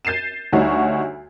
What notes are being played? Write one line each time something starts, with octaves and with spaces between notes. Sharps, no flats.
G6 A6 C7 D#7 E7
D2 G3 D#4 F#4 C#5